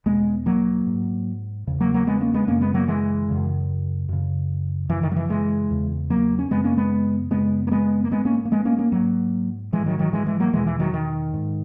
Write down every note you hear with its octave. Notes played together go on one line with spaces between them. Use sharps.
E2 B2 G#3 B3
F#3 A#3
G#2
E2 C#3
F#3 A#3
F#3 A#3
G#3 B3
A#3 C#4
G#3 B3
F#2 C#3 A#3 C#4
G#3 B3
F#3 A#3
E3 G#3
F#2 C#3
F#2 C#3
F#2 C#3 E3
D#3
F#3
E3
E3 G#3
E2 C#3
F#3 A#3
C#4
F#2 C#3 G#3 B3
A#3 C#4
G#3 B3
F#2 C#3 G#3 B3
A#3
G#3 B3
A#3
G#2 G#3 B3
A#3 C#4
A#3
G#3 B3
A#3 C#4
A#3 C#4
G#2 F#3 A#3
G#2 E3 G#3
D#3 F#3
D#3 F#3
E3 G#3
E3 G#3
F#3 A#3
E2 B2 E3 G#3
E3
D#3 F#3
D#3
G#2